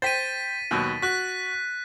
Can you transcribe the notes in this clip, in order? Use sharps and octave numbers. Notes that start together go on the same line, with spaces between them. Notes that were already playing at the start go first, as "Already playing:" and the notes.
C5 G5 A6 B6 D#7
D#2 B2 F#3
F#4 F#6 B6